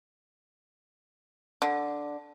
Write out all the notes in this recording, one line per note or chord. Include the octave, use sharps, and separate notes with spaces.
D3